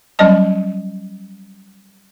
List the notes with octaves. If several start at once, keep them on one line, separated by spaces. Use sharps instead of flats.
F#3 G3 C#4 D5 D#5 A5